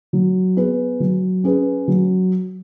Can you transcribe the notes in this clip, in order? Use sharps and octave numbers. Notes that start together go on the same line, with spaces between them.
F#3
B3 G#4 B4
F#3
C#4 G#4 B4
F#3